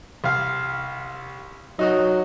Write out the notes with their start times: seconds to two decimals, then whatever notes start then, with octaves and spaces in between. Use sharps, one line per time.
0.24 C2 F5
1.79 F#3 D#4 F#4 D#5